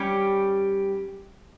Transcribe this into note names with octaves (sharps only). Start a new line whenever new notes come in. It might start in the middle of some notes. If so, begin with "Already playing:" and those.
Already playing: G3 C#4 G4